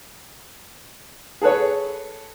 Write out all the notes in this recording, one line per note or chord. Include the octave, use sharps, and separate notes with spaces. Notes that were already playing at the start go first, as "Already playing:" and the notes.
G#4 A4 B4 C#5